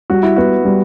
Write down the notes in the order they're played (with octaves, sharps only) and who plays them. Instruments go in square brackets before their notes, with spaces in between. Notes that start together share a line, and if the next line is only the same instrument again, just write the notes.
[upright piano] G3 [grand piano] F#4
[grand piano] E4
[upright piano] B3 [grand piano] F#4
[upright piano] G3